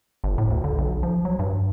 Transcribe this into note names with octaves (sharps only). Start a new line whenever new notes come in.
G1
A2
D2
D3
B1
F3
F#3
G2